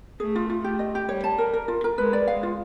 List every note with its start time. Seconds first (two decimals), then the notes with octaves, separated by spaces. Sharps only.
0.20 A3 G#4
0.35 F4
0.50 F4
0.64 A3 G4
0.79 D#5
0.95 G4
1.09 G3 C#5
1.24 A5
1.38 A#4
1.53 A#4
1.68 F4
1.84 A#4
1.98 G#3 B4
2.13 D5
2.27 F5
2.43 F4